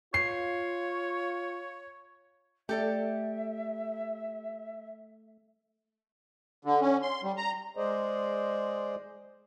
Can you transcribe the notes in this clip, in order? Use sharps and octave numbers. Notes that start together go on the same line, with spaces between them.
F4 C#5 C7
A3 G4 A4 D5 E5
D3
C#4
C6
G3
A#5
G#3 G#4 C5 D5 D#5